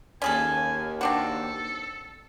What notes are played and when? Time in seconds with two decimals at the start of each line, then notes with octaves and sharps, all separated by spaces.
0.22 D#2 C#4 G#4 A4 G#5
1.01 C4 D4 F#4 A4